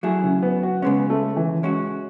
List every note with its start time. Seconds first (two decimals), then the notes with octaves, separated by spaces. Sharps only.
0.03 F#3 A3 E4 G#4
0.23 C#3
0.42 B3
0.63 F#4
0.82 C#3 G#3 B3 C#4
1.10 A3
1.36 E3
1.63 G#3 C#4 F#4